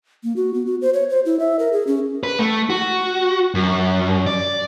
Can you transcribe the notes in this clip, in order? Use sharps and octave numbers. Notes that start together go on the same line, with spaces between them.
A#3
F#4
B3
F#4
C5
C#5
C5
E4
E5
A#4
G#4
C#4
B4
A3
F#4
F#2
D5